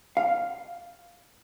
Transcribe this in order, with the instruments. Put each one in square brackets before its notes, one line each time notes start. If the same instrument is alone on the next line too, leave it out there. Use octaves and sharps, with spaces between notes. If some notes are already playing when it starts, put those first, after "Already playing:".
[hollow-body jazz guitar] F5